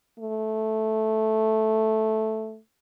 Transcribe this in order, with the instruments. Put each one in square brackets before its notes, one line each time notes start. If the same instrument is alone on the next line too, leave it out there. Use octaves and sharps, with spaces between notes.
[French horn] A3